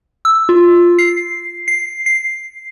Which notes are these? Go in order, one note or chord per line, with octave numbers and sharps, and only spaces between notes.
E6
F4
C7
C7
C7